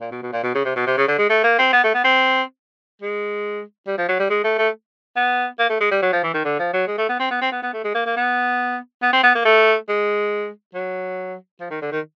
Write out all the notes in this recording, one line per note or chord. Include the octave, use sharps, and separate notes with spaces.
A#2
B2
B2
A#2
B2
C#3
C3
B2
C3
C#3
D3
G#3
A3
A#3
C4
B3
A3
B3
C4
G#3
G3
F3
F#3
G3
G#3
A3
A3
B3
A#3
A3
G#3
G3
F#3
F3
E3
D#3
D3
F3
F#3
G#3
A3
B3
C4
B3
C4
B3
B3
A3
G#3
A#3
A#3
B3
B3
C4
B3
A#3
A3
G#3
F#3
F3
D#3
D3
D#3